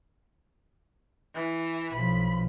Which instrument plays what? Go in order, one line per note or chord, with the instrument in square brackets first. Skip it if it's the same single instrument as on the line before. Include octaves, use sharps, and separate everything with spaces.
[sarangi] E3
[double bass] B1 F3 [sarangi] B5